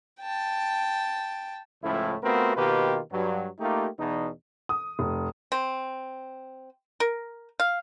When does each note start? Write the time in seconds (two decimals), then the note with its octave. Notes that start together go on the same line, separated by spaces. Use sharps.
0.21 G5 A5
1.83 C#2 A2 F3 A3 C#4 E4
2.23 A3 B3 C4 F4 F#4 A#4
2.57 B2 D#3 A#3 F4 G4 B4
3.12 G2 F#3
3.60 A3 A#3 D#4 F4 G4
3.98 E2 B2 D#4
4.69 D#6
4.99 F1
5.52 C4
7.00 A#4
7.60 F5